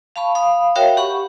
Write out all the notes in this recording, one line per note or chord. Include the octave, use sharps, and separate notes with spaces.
F5 A5 B5 C#6
F5 B5 D#6
F#4 A#4 C#5 E5 F5 G5
G4 F#5 B5 C#6